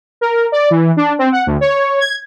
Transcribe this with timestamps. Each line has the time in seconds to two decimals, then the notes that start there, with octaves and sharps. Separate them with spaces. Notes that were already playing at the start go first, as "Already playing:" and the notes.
0.21 A#4
0.52 D5
0.71 E3
0.97 D4
1.19 C4
1.32 F#5
1.47 D2
1.61 C#5
2.00 G#6